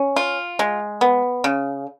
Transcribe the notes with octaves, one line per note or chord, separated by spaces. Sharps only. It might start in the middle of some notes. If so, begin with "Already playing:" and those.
Already playing: C#4
F4
G#3
B3
C#3